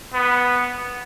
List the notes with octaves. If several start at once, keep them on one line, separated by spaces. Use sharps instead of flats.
B3